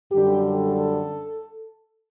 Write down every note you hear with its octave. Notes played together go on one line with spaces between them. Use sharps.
F#2 D3 G3 G4
A4